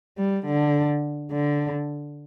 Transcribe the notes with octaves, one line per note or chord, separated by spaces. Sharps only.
G3
D3
D3